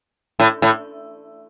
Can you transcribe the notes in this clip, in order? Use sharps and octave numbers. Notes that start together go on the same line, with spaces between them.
A2
A2